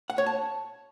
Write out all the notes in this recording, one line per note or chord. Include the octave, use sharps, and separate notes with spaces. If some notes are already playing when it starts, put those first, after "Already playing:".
F#5
C#5
A5